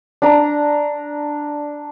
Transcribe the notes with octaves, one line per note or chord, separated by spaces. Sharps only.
D4 A#5